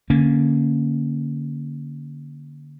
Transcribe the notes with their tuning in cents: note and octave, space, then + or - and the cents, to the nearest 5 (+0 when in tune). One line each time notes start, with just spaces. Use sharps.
D3 +0 A#3 +0 C#4 +0